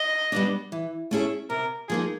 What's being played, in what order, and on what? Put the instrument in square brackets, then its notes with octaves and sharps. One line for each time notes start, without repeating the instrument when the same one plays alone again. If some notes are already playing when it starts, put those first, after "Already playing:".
Already playing: [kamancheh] D#5
[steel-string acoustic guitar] G3 B3 D4
E3
A3 C#4 E4 G#4
[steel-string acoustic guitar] C3 [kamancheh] A#4
[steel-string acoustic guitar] F3 A#3 D#4 [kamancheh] G#4